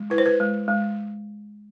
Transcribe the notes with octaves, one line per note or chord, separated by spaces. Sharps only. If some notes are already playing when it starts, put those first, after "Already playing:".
Already playing: G#3
E4 B4
C5
B4
G#3
G#3